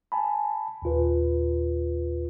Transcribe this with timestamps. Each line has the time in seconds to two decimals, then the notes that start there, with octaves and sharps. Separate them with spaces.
0.12 G#5 A5 B5
0.82 D#2 A#2 F4 B4